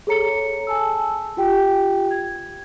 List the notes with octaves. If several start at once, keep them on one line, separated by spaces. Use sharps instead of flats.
G#4 A4 C#5 A#5 C#7
G#5 A5 E6
F4 G4 G5
G#6